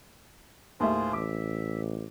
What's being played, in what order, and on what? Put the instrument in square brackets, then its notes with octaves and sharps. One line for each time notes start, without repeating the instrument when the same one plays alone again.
[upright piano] D#2 A2 E5 [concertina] F4 G#4 C5
[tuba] A1 [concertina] E5 [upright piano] D6